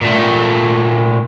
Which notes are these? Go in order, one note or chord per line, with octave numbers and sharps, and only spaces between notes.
A#2 A3